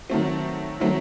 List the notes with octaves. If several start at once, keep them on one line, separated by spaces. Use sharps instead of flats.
D#3 F#3 A3 C4
D#3 F#3 A3 C4